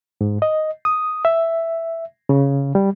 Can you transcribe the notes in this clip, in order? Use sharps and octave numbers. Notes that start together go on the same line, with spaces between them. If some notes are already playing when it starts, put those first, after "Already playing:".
G#2
D#5
D#6
E5
C#3
G3